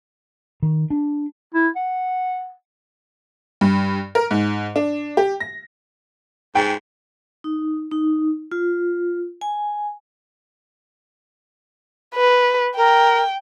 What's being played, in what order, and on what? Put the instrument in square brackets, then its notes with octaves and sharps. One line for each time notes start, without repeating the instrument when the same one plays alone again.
[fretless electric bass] D#3
D4
[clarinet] E4
F#5
[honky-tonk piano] G2
A#4
G#2
D4
G4
A#6
[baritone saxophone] G#2 [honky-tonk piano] G5
[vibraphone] D#4
D#4
F4
G#5
[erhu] B4
[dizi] A#4 [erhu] G5